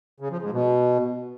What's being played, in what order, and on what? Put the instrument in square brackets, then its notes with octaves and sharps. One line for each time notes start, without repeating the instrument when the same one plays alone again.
[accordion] C#3
F3
G#2
B2